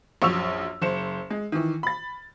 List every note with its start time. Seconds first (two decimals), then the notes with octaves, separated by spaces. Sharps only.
0.22 A#1 F#2 C#6 E6 F7
0.82 F#1 C5 C#7 E7
1.30 G#3
1.52 D#3 E3
1.83 B5 A6